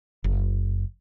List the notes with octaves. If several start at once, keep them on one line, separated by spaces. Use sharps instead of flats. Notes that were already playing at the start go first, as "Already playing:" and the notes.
F#1